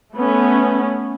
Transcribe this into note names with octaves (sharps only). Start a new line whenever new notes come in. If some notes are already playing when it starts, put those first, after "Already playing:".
A3 B3 C#4